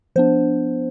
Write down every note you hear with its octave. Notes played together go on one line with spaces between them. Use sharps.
F3 B3 D4 C5